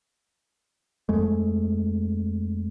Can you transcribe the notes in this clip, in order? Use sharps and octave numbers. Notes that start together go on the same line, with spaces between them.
F2 G#3 A3